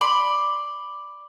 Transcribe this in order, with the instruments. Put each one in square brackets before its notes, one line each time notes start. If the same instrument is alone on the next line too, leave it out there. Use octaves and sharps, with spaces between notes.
[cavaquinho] D5 B5 C6